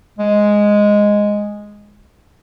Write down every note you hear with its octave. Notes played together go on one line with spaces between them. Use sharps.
G#3